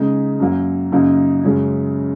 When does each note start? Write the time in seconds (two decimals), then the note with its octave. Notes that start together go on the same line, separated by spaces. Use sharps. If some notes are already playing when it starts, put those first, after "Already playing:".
Already playing: C#3 G#3 D#4
0.40 F#2 F#3 A#3
0.92 F#2 C#3 A#3 D#4
1.43 F#2 C#3 G#3 C#4